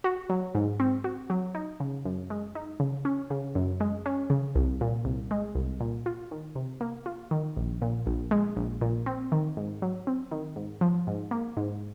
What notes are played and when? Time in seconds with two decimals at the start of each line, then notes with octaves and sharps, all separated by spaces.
0.04 F#4
0.30 F#3
0.55 G#2
0.80 C4
1.04 F#4
1.30 F#3
1.55 D#4
1.80 C#3
2.05 F#2
2.30 G#3
2.55 D#4
2.80 C#3
3.05 C#4
3.30 C#3
3.55 F#2
3.80 G#3
4.06 C#4
4.30 C#3
4.55 C2
4.81 A#2
5.05 C2
5.31 G#3
5.55 C2
5.80 A#2
6.06 F4
6.31 D#3
6.55 C3
6.81 A#3
7.06 F4
7.31 D#3
7.57 A#1
7.82 A#2
8.06 A#1
8.31 G#3
8.57 A#1
8.81 A#2
9.06 C4
9.32 D#3
9.57 G#2
9.82 F#3
10.07 C4
10.31 D#3
10.56 G#2
10.81 F3
11.07 G#2
11.31 A#3
11.57 G#2